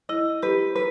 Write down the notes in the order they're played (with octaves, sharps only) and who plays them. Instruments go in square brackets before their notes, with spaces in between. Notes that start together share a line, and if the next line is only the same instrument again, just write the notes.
[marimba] E4 [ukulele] D#5
[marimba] G4 [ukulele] B4
[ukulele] B4